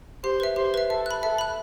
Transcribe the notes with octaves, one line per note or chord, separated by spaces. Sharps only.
G4 C5
B4 E5
G4 C5
B4 E5
A4 E5
B5 F#6
A4 E5
B5 F#6